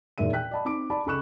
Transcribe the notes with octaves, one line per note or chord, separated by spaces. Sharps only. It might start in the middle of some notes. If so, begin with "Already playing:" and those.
E1 A#2 D#3 G#3 E5 D#7
G5 F#6 B6
D5 D#5 A5 B5
C4 D#4 D6 D7
D5 A5 B5
C#2 A4 B5 C#6 F#6 E7